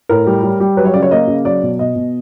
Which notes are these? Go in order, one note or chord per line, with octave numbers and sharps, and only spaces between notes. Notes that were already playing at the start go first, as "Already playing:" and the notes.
A2 A#4
G3
G3
G3
F#3 B4
C#5
C#3 D5
C#5
A#3 D#5
C#3
F#3 D5
B2
B2 D#5
B2